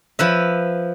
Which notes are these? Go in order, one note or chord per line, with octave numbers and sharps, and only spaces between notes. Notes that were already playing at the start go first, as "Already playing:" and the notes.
F3 B4 E5